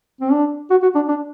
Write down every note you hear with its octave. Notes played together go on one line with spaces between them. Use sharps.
C4
D4
F#4
F#4
D4
D4